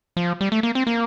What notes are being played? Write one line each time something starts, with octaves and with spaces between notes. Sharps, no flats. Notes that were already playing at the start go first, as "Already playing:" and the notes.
F3
G3
A3
A#3
C4
A#3